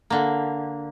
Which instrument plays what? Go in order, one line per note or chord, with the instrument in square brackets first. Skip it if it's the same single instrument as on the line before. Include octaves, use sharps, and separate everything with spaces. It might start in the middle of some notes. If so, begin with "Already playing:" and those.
[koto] D3 A#3